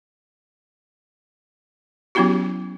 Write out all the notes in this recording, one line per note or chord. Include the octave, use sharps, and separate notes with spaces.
F#3 B3 C#4 E4 F#4 G4